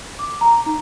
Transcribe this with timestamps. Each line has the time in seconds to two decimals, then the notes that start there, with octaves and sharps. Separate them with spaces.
0.19 D6
0.41 A#5
0.66 D#4